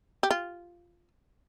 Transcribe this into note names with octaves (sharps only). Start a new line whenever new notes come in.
G4
F4